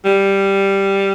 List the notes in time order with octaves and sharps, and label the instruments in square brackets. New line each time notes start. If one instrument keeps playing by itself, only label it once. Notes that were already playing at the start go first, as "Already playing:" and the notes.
[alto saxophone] G3